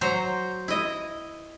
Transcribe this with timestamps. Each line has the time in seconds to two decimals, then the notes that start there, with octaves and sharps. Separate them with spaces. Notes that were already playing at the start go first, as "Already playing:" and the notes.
0.01 F#3 C5 A#5
0.68 E4 D#5